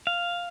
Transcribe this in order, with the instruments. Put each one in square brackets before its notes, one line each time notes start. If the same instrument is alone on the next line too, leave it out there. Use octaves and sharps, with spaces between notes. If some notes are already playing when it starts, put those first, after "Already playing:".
[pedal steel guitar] F5